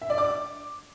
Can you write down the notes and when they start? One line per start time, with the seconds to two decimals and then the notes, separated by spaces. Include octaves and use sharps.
0.02 E5
0.10 D5
0.18 D6